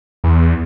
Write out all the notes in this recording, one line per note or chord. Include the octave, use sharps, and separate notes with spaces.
E2